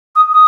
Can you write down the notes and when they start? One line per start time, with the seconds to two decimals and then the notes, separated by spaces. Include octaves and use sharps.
0.15 D#6
0.32 D#6